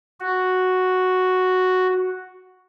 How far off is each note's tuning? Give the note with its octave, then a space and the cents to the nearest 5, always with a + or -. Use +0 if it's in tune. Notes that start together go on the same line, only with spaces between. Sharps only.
F#4 +0